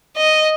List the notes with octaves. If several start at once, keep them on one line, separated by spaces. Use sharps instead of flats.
D#5